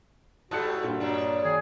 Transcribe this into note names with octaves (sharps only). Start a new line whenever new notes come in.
G#2 G3 A3 F#4 A5 F#6 C#7
G2 A#2
B2 F#3 D4
D#3 G#4